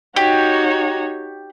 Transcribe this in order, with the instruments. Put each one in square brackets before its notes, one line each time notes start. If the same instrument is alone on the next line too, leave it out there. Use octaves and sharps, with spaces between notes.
[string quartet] D#4 F#4 C#5 [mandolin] G4